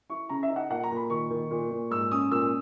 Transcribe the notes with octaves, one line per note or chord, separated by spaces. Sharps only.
E4 C#6
C#3 A#5
E5
D#4
F#5
A#2 F#5
A#5
A#2
B5
D#3 C#6
D#3
A#2
A#2
G#2 E6
C#4 D#6
A#2 E6